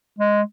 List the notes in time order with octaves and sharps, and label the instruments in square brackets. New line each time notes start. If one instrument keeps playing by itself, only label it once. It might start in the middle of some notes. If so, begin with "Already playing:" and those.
[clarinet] G#3